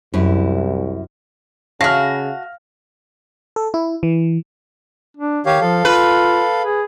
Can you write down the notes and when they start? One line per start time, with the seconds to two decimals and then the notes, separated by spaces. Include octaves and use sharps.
0.14 C2 F#2 E4
1.81 C#3 A3 F#4 F5 F6 A#6
3.56 A4
3.74 E4
4.03 E3
5.17 D4
5.46 D#3 G4 C#5 F5
5.61 F3 A4 F5
5.85 F4 B4
6.62 G#4